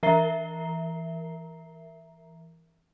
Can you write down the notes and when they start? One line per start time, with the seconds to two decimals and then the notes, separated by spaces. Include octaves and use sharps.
0.03 E3 A#4 E5 A#5 C7 G7